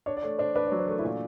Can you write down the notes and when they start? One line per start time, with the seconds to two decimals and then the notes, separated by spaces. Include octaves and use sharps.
0.06 D4 C#5
0.17 D5
0.23 A3 C#5
0.38 D4 C5
0.56 D4 B4
0.67 C#5
0.72 F#3
0.79 C5
0.87 A3 A#4
0.99 E4
1.04 A#2 F4